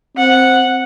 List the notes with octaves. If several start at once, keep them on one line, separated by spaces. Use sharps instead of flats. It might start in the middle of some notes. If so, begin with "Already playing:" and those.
C4 F#5